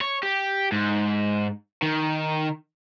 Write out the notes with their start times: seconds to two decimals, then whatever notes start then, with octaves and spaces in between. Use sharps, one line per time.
0.01 C#5
0.23 G4
0.72 G#2
1.83 D#3